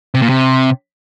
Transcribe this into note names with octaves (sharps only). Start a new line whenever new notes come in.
C3
A#2
C3